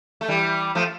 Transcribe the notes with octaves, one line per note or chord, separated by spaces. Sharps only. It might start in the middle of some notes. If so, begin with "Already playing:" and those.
A3
E3 G3
F3 A3